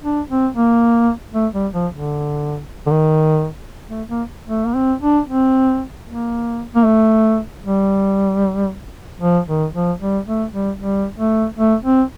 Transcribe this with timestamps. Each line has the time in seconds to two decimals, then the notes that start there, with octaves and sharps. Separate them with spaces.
0.03 D4
0.29 C4
0.55 A#3
1.33 A3
1.53 G3
1.73 F3
1.92 D3
2.87 D3
2.91 D#3
3.89 A3
4.09 A#3
4.48 A3
4.67 A#3
4.75 C4
5.01 D4
5.27 C4
6.07 A#3
6.75 A#3
6.85 A3
7.63 G3
9.20 F3
9.47 D#3
9.74 F3
10.00 G3
10.26 A3
10.52 G3
10.79 G3
11.18 A3
11.57 A3
11.84 C4